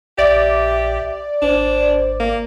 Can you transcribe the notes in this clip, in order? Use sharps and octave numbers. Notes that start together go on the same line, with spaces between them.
A#1 G4 D5 E5
G#1 D4 C5
A#3